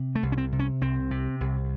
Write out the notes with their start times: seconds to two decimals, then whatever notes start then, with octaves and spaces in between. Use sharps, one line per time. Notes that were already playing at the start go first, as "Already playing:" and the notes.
Already playing: C3
0.15 A3
0.23 C2
0.32 C#4
0.38 C4
0.52 C3
0.59 C#4
0.81 C2 C4
1.11 C3
1.41 C2